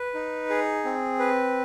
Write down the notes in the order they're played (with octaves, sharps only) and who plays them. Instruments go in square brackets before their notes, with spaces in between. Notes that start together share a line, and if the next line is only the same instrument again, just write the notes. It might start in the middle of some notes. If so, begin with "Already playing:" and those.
Already playing: [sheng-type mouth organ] B4
D#4
G#4
C4
B4